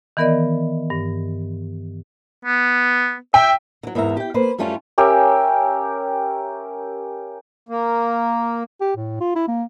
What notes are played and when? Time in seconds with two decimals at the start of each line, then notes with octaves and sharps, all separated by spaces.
0.17 D#3 E3 B3 A#4 D5 D#5
0.90 G2
2.45 B3
3.34 E5 G5
3.83 D3 F#3
3.95 E2 G#2 A#4 E5 A#5
4.17 G4 G5
4.34 A#3 B4 C5
4.58 F#2 G3 A3 C#4 F4 A5
4.98 C#4 G4 A#4 E5
7.69 A#3
8.81 G4
8.97 A2
9.21 F4
9.36 E4
9.48 A#3